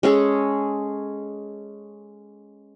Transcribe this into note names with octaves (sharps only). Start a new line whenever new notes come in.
G#3 C#4 G#4 A4